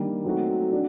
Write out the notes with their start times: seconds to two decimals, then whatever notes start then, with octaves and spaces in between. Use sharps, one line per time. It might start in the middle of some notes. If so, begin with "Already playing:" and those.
Already playing: D#3 G3 A#3 D4
0.24 F#3 A3 C4 D#4 F#4
0.72 D4 F#4